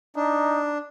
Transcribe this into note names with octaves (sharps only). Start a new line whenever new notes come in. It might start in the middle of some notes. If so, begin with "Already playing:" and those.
D4 D#4